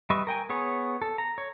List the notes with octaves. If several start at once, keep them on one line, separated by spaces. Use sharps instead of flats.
G3 B4 D#5 E5 C#6
A#4 G5 G#5
B3 G#4 C#5
A4
A#5
C#5